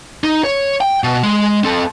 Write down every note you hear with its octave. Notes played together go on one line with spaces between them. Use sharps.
D#4
C#5
G5
B2
G#3
C4 A4